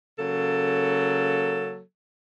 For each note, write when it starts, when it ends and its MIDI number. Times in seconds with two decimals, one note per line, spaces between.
0.19 1.80 49
0.19 1.80 54
0.19 1.80 58
0.19 1.80 69